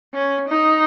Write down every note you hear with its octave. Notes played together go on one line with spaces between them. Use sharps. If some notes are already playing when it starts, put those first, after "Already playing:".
C#4
D#4